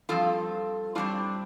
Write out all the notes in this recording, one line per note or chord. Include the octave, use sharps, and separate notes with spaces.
G2 F3 C4 F4 A4
A2 G3 C4 D4 F4